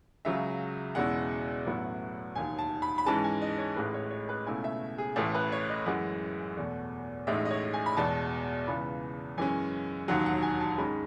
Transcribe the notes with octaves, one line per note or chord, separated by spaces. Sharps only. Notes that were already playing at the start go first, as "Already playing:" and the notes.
C#2 C#3 F#3 E5
E2 B2 G#3 C#4 E4 F#5
A1 A2 F#3 B3 E4
E1 D#2 D#3 G#5
A5
B5
B5
G#2 E3 G#3 C#4 A5
G#5
D#5
C#5
A1 A2 G#3 B4
C#5
C#5
B4
C#2 B2 A3 C#4 E4 G#5
E5
G#4
A1 A2 E3 A3 A4
B4
C#5
D#5
F#2 E3 G#3 F#5
E2 B2 A3
A1 A2 G#3 D#4 E5
D#5
C#5
G#5
B5
E2 B2 G#3 A5
C#2 C#3 E3 B3 B5
F#2 E3 G#3 C#4 G#5
E1 D#2 D#3 F#3 F#5
F#5
G#5
A5
G#2 D#3 G#3 C#4 B5